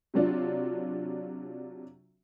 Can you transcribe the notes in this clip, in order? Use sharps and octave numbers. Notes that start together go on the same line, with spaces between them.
C3 F#3 D4 F4